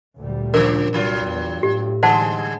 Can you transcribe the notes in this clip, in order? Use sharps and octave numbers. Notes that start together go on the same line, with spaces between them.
D2 A#2 G3
C#3 F3 A#4
C2 G2 F#3 F4
E2
A2 G4
D3 G3 G#3 C5 F#5 A5